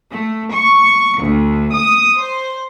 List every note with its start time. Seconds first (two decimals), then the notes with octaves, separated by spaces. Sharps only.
0.12 A3
0.53 C#6
1.20 D2
1.76 D#6
2.18 C5